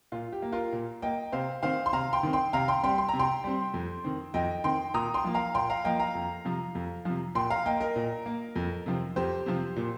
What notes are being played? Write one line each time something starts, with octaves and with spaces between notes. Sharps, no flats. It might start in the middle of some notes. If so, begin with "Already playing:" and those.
A#2 F4
G4
A#3
F4 A#4
A#2
A#3 D#5 G5
C3 C5 F5
D#3 C4 C5 F5
C6
C3 F5 A#5
G5 C6
D#3 C4
G5 C6
C3 F5 A#5
G5 C6
G3 C4 G5 C6
C6
C3 A#5
G5 C6
G3 C4
F2
D#3 C4
F2 D#5 G5
D#3 C4 G5 C6
A#2 A#5 D#6
G5 C6
F3 A#3
F5 A#5
A#2 G5 C6
F5 A#5
F3 A#3 D#5 G5
F5 A#5
F2
C3 F3
F2
C3 F3
A#2 G5 C6
F5 A#5
A#3 D#5 G5
A#4 D#5
A#2
A#3
F2
C3 F3 C4
F2 G4 C5
C3 F3 C4
A#2